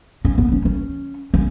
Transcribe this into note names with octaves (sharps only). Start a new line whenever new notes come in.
C#4
B3
C#4
C#4
C#4